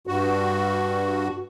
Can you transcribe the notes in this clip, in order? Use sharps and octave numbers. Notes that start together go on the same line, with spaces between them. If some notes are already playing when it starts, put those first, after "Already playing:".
G2 F#4